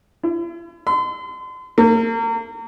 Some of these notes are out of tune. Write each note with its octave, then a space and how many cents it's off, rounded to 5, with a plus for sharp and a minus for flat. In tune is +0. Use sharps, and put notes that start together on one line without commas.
E4 +45
C6 -40
A#3 -35